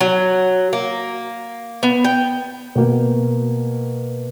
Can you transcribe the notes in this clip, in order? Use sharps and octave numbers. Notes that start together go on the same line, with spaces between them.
F#3
A#3
B3
G5
B2 A#3